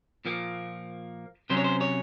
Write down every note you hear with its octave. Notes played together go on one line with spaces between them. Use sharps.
A#2 F3 A#3
C3 F#3 C#4 C5
C#5
C5
C#5